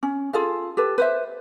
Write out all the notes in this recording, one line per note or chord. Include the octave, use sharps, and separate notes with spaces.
C#4
F4 G#4 A4 F5
G4 A4 B4
B4 C5 E5